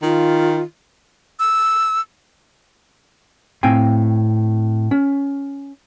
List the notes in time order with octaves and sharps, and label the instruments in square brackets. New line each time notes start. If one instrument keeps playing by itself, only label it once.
[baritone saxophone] D#3 [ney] F4
[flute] E6
[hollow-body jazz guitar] A2 C4 F5 G5 G#5
C#4